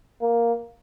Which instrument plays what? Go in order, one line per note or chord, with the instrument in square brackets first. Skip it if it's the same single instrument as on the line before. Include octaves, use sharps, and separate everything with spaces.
[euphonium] A#3